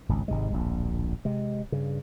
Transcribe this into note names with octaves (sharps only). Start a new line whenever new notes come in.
G#1 C#2
G#1 G#2 C3 G#3
D1 A#1
C3 G#3
G2 C#3